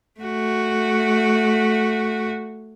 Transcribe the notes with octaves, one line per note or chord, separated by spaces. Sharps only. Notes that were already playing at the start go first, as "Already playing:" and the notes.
A3 F#4